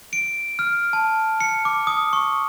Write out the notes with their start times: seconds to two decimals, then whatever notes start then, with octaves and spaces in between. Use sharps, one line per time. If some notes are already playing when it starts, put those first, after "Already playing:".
0.13 D7
0.59 F6
0.93 A5
1.40 C#7
1.65 D6
1.87 D#6
2.13 C#6